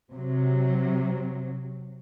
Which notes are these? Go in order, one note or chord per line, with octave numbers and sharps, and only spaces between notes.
C3 F#3